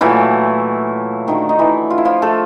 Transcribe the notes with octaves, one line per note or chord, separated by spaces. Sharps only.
A#2 E3 F#3 A3 E4
D3 D#3 F#3 A3 D#4
D#4
E3 E4
F4
E4
F3 F4
A3 A4